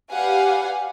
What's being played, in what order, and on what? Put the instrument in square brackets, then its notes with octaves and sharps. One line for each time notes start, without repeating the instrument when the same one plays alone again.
[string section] G4 B4 D5 F5 F#5 G#5